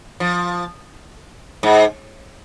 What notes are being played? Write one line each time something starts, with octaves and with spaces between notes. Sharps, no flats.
F3
G#2